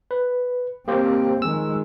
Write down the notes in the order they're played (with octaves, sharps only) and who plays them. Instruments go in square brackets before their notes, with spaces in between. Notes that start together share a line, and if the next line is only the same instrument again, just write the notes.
[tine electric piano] B4
[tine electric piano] A#3 G4 C5 [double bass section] C4
[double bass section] D#3 F3 G#3 [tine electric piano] E6